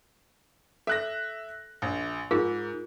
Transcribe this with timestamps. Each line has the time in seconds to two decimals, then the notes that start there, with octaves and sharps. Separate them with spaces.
0.87 A4 E5 F#6 A#6
1.82 A#1
2.31 G#2 F4 G#4 A#4